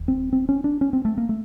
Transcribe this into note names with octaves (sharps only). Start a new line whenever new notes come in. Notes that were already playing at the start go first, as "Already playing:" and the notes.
Already playing: E1 D#2
C4
C4
C#4
D4
C#4
C4
A3
A#3
A3